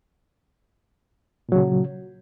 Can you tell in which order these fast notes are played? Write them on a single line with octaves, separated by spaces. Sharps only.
A#2 F#3 C#3